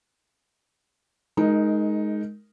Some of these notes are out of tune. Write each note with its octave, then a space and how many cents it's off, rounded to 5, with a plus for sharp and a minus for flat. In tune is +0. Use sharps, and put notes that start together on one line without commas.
G#3 +20 D#4 +0 A#4 +0